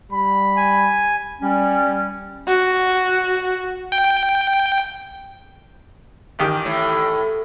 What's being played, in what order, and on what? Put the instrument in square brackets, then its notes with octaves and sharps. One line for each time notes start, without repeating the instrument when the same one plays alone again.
[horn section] G3 B5
[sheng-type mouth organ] G#5
[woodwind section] G3 C#4
[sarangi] F#4
[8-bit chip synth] G5
[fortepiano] A1 D#3 G4
[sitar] A2